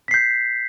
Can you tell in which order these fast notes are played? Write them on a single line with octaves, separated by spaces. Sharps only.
B6 C7 G6